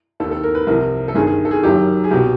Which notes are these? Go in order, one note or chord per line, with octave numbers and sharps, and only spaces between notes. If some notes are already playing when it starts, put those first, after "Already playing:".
D#2 D#3 A4
A4
A#4
B4
C2 C3 F3 A#4
A4
G1 G2 D#3 G#4
G#4
A4
G#4
F#1 F#2 D#3 G4
G#4
C2 B2 G4